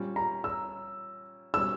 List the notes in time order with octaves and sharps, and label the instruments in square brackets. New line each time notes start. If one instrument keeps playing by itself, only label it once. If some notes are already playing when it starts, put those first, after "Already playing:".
Already playing: [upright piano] A#2 G3 C#4
[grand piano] A#5
E6
[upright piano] B2 G3 C#4 [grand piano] E6